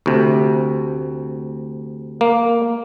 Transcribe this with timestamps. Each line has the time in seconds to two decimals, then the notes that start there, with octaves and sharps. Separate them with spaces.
0.06 D2 C3
2.21 A#3